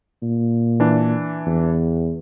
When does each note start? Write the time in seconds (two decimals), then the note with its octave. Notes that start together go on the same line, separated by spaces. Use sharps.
0.22 A#2
0.80 E3 D4
1.47 E2